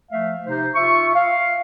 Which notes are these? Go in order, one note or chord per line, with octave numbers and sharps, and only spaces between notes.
F3 A3 E5 F5
C3 D#4 C5
F4 E5 C#6
F5